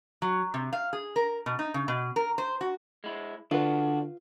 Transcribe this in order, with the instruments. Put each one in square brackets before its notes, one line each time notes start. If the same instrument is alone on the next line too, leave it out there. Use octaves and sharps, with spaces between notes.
[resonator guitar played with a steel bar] F#3
C3
F5
G#4
A#4
B2
D#4
C#3
B2
A#4
C5
F#4
[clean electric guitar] G#3 E4
[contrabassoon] D3 [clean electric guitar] D4 F#4 [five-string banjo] F4 B4